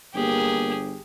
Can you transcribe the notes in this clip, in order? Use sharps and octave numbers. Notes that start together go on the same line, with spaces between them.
G1 A#3 G4 G#4